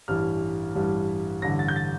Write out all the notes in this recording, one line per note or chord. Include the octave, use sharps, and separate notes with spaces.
A1 G2 E3 G3 F6
A1 G2 E3 G3
A1 G2 D3 A#6
A6
G6
A6